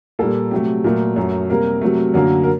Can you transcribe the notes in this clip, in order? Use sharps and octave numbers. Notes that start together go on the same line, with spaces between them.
A#2 G3 A#3 A4
C3 F#3 A3 G4
A#2 F#3 A3 A#4
F#2 F#3 A3
C3 G3 A#3 A#4
C3 F#3 A3
F#2 D3 F#3 A#3 A#4
A#4